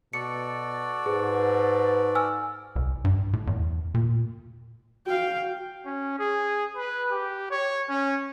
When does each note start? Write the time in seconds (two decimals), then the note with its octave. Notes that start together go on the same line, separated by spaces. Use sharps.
0.13 B2 F#4 A4 D5 C#7
1.06 G#2 G#4 B4
2.15 G#5 E6 F6
2.76 C2
3.04 G2
3.33 A2
3.47 E2
3.94 A#2
5.06 F#4 F5 G5
5.86 C#4
6.19 G#4
6.77 B4
7.11 G4
7.51 C#5
7.89 C#4